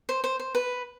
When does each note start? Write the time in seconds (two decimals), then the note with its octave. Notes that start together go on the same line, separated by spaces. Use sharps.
0.09 C5
0.24 C5
0.40 C5
0.55 B4